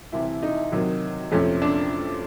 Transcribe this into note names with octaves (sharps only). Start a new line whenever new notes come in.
C2 C3 E3 E4
D#4
C3 D#3 F#3
F2 C3 F3 A3 C#4
D4